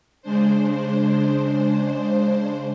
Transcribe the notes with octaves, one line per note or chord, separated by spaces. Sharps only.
C#3 G#3 D4 C5